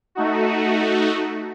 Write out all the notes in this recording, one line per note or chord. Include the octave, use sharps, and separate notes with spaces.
A3 D#4 F#4